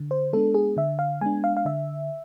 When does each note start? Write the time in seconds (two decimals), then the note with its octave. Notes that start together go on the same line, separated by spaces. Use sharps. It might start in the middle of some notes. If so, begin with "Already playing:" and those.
Already playing: D3
0.11 C5
0.33 G#3 B3 D4 A4
0.54 G#4
0.77 D3 E5
0.99 F5
1.21 G#3 B3 D4 G#5
1.44 F5
1.57 F5
1.65 D3 E5